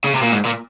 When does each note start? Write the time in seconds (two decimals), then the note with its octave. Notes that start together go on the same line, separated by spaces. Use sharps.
0.05 C#3
0.15 C3
0.23 A#2
0.32 G#2
0.46 A#2